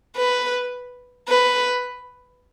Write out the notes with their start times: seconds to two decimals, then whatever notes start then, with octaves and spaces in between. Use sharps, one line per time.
0.17 B4
1.28 B4